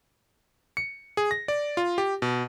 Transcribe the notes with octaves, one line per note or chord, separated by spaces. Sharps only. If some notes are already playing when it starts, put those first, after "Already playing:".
C#7
G#4
A#6
D5
F4
G4
B2